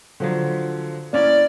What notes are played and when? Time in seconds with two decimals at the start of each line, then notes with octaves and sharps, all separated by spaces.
0.20 D3 F3 F#3
1.13 A#3 C#4 E4 D5